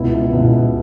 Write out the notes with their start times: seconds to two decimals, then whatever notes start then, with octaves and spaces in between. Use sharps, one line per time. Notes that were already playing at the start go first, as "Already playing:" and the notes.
Already playing: C#2 B2 B3 E4
0.33 C#2 B2 B3 E4